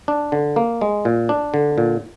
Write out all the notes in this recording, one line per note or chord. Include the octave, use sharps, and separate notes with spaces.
D4
D3
A#3
G#3
A#2
D4
D3
A#2